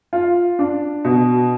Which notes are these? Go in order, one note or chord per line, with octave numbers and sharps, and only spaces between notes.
F4
D4
B2